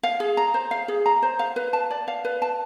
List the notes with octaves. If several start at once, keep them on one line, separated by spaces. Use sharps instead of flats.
F5
G#4
A#5
C5
F5
G#4
A#5
C5
F5
B4
A5
D5
F5
B4
A5